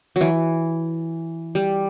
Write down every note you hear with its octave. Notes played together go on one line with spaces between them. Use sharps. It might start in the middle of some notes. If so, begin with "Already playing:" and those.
F#3
E3
G3